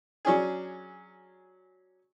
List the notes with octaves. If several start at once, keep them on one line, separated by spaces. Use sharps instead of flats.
F#3 C#4 D4 G#4